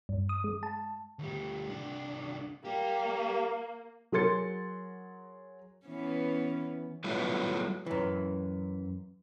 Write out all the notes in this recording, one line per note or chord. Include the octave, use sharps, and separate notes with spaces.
G2
D#6
G#3
A5
D2 G3
C2 D4
G3 A#3 G4
F#3 G#4 A#4 C6 A6 C#7
E3 B3 C#4
F#3 G3 A3 B3 E4 F4
F#2 E3